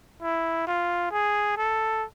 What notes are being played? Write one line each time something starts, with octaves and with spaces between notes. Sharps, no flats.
E4
F4
G#4
A4